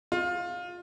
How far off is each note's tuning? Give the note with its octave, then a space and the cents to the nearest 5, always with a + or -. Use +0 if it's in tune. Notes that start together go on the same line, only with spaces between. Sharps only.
F4 +20